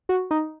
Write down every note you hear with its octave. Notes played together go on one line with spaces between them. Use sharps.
F#4
D#4